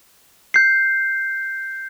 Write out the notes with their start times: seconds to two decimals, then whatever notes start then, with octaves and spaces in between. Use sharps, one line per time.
0.54 G6 C7